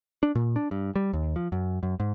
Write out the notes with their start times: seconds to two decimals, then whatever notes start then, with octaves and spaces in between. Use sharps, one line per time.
0.23 D4
0.35 A#2
0.56 D4
0.71 G2
0.96 G3
1.13 D#2
1.36 F3
1.52 F#2
1.83 F#2
2.00 G#2